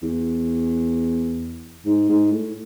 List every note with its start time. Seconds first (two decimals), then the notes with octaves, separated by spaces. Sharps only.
0.03 E2
1.86 G#2
2.09 G#2
2.32 A2